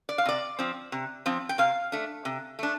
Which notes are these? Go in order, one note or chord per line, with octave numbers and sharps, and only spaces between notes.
D5
F5
C3 D5
F3 C4
C3
F3 C4
G5
C3 F5
A3 D4
C3
A3 D4